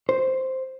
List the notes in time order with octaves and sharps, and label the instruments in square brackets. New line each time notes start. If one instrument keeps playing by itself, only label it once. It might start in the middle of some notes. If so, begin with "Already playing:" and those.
[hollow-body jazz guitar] C5